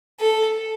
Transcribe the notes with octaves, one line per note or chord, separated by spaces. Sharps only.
A4